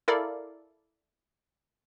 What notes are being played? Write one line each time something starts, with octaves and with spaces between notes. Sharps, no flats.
E4 A4 A#4 D5 F5